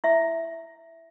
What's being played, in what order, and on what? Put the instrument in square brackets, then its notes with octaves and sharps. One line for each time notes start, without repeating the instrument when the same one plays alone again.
[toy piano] E4 E5